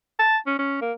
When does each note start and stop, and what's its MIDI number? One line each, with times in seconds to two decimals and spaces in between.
0.19 0.37 81
0.47 0.58 61
0.59 0.77 61
0.82 0.93 58